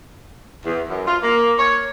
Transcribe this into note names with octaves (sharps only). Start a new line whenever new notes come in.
E2
F#2
F4
A#3
C#5